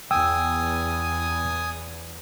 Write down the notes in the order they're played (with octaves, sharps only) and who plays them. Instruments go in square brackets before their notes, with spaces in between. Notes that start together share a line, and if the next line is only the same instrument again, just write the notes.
[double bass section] E2 [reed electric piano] G5 E6 [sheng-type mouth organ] G#5 D#6